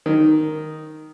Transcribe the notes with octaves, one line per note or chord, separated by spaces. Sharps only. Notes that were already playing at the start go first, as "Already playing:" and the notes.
D#3